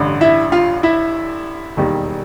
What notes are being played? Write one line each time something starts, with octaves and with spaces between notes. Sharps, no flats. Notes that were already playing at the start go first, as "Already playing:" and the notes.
Already playing: A1 G2 D3
E4 E5
F4 F5
E4 E5
E1 D#2 D#3 G3